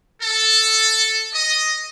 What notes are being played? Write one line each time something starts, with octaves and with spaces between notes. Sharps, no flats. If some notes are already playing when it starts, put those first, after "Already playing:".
A4
D#5